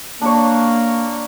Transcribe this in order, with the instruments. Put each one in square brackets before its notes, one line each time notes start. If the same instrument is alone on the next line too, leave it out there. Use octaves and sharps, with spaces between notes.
[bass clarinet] A#3 [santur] D4 C#5